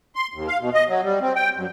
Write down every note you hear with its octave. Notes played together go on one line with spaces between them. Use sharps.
C6
D#2
F5
B2
D#5
F#3
G3
C4
G5
F#2